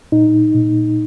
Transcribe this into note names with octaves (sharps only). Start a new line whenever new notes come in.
A#2 D#4
A#2